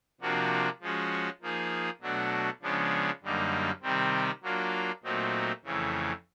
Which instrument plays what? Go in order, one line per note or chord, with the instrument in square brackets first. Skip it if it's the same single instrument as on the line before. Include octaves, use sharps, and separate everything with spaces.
[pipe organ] C3 F3 A#3 D4 F#4
F3 G#3 C#4 F#4
F3 A#3 D#4 G#4
B2 F#3 A3 D4 F#4
C#3 F3 G#3 B3 D4
F#2 D3 G3 A#3 D#4
C3 D#3 G3 C4
F#3 A#3 D4 F4
A#2 F#3 A3 C4 D#4
F2 C#3 E3 A3